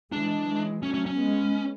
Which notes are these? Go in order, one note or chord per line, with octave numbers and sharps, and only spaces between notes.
E3 G#3 D4
E3 G#3
F#3 A3 C#4
C#4
C#4
G#3 B3